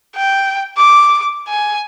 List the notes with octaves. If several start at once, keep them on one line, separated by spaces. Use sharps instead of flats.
G5
D6
G#5